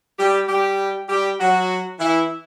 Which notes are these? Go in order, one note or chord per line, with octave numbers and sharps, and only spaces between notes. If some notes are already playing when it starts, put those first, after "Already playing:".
G3 G4
G3 G4
G3 G4
F#3 F#4
E3 E4